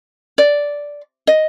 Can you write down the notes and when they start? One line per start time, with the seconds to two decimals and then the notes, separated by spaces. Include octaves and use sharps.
0.38 D5
1.27 D#5